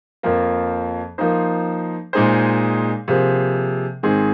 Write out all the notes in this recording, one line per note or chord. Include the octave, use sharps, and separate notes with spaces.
F2 F3 A#3
F3 A#3 D#4 C5
A#2 G#3 D#4 G#4 C5
C3 F3 A#3 G#4 C5
G#2 D#3 C4 G#4